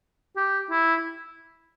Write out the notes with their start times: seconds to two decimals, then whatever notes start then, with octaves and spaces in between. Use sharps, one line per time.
0.36 G4
0.71 E4